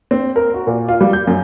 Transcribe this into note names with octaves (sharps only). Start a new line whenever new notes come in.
C4
A#4
F#4
A#2
F4
G3
G6
F#2